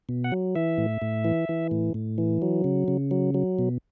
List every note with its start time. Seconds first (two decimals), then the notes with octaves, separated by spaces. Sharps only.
0.09 B2
0.24 F#5
0.32 F#3
0.55 E3 E5
0.78 A2
1.02 A2
1.25 E3
1.49 E3
1.71 A2
1.94 A2
2.18 E3
2.42 F#3
2.64 C#3
2.88 C#3
3.11 F#3
3.34 F#3
3.59 B2